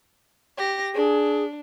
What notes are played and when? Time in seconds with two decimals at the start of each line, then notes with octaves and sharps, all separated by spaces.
0.56 G4 A#6
0.94 D4 G#4